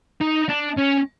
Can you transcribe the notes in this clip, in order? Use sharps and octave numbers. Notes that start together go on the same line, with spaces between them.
D#4
D4
C#4